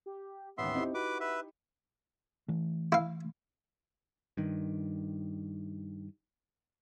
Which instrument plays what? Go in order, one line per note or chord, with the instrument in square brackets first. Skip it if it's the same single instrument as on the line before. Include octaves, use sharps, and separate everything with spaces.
[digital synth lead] G4
[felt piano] A1 D#2 [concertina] B3 E5 C6
[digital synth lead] C4 [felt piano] D#4 E4 G4
[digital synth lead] F#4 [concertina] B4 D6
[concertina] B4 E5
[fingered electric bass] E3 A3
[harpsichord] E4 F5
[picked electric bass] G2 D#3